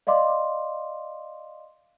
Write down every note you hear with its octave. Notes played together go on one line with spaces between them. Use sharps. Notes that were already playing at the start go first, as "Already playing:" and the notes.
D5 D#5 F5 C6 D6